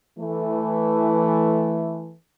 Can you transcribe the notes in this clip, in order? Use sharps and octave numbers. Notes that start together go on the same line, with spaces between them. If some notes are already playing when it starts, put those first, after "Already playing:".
E3 A3